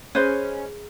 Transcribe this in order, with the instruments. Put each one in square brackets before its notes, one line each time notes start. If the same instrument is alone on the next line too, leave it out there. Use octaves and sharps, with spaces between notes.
[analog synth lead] C#4 [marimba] G#4 [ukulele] B4 C5 D#5